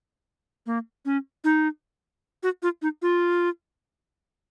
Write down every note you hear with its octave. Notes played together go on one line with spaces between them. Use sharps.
A#3
C#4
D#4
F#4
F4
D#4
F4